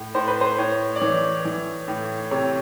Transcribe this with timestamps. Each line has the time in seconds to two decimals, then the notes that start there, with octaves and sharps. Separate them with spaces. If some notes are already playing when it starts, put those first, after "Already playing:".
Already playing: A2
0.15 A2 C5
0.28 B4
0.41 C5
0.58 A2 C#5
0.96 D5
1.01 E3 C#5
1.45 E3
1.88 A2
2.31 C3 C#5